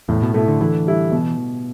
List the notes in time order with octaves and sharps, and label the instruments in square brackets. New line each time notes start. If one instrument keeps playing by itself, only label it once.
[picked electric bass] E2 [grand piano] A2
[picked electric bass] B2
[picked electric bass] B2 [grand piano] A3 E4
[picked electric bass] D3
[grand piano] D3 [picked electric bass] E3
[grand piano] G3 E4
B2